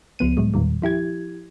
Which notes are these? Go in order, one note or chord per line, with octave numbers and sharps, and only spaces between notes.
C#2 F3 B3 D#7
A2 F#3 G#3
E2 A#2 D#3 G3
F3 E4 G4 G#6